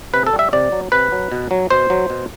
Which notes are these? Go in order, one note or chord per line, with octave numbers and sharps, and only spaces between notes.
C3 B4
A4
G3
E5
C3 D5
F#3
C3 B4
F#3
B2
F#3
B2 C5
F#3
B2